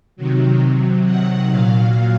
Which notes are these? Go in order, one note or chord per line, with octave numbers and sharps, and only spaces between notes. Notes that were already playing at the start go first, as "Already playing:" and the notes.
C3 D#3 F#3
C3
F#3
C3 D#3 F#3 F#5
A#2 F#3 F5